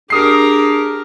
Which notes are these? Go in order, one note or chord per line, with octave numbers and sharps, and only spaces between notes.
D4 G4 G#4 A#4 D#6 C7